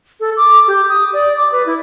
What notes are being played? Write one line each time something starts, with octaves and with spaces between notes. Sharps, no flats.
A4
D6
G4
D#6
D5
D6
B4
E4